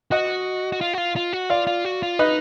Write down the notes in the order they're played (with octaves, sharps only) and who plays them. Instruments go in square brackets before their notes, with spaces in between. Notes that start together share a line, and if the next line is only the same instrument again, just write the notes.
[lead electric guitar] F#4 [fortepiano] D#5 F#5
[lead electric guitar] F#4
F4
F#4
F4
F4
F#4
[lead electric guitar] F4 [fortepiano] D5 F5
[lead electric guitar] F4
F#4
F4
[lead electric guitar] D#4 [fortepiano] B4 D#5